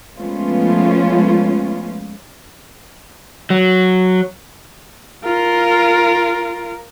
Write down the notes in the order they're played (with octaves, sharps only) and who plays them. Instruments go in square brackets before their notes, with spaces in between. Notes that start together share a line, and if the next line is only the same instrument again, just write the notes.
[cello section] F3 G#3 A3 B3 C#4 F4
[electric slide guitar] F#3
[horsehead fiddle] F4 A#4